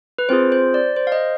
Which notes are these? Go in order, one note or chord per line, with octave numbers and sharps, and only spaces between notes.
B4
C4 F4 G#4 C5
C5
D5
C5
F5
D#5